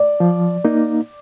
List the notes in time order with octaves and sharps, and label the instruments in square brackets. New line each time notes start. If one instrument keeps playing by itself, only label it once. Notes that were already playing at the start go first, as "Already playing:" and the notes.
Already playing: [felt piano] D5
[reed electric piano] F3
A#3 D#4